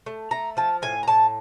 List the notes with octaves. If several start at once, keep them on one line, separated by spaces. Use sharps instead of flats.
A3
A3 A#5
F3 A5
A2 G#5
A#5
A2 A5